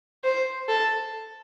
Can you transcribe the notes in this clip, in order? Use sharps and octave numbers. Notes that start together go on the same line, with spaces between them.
C5
A4